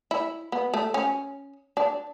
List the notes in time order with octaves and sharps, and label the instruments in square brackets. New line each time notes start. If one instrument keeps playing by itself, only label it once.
[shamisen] E4
B3
A3
C#4
D4